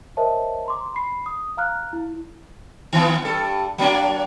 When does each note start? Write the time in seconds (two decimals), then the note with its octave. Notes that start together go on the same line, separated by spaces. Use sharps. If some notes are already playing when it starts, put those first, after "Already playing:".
0.17 A#4 C5 C#5 D#5 E5 A5
0.66 A#5 C6 D6
0.94 B5 C7
1.26 D#6
1.57 F5 A#5 F6 F#6
1.93 E4
2.93 D#3 E3 B3
3.22 G2 A4
3.78 F#3 A#3 D4